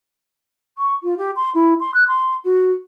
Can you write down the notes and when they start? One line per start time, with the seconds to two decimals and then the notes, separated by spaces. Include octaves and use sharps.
0.77 C#6
1.03 F4
1.17 G4
1.36 C6
1.54 E4
1.80 C6
1.94 F#6
2.08 C6
2.44 F#4